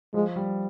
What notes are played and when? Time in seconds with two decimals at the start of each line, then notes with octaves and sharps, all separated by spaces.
0.14 F3 G#3
0.36 G3